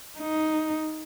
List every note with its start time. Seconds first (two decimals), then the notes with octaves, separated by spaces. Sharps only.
0.19 D#4